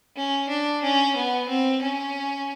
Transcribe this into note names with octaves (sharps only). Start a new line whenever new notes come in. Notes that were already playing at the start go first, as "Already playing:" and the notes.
C#4
D4
C#4
B3
C4
C#4